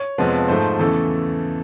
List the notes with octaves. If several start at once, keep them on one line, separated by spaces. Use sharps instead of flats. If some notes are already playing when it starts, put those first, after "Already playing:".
Already playing: C#5
F2 C3 F3 G#3 B3
G#2 F3 A3 C5
E2 C#3 E3 A3 A4